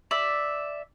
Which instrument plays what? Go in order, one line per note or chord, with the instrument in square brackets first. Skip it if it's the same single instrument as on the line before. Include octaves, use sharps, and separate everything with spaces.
[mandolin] D5 E5